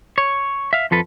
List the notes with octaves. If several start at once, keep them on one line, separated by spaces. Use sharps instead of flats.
C#5
E5 F5
F2 F3 A4 B4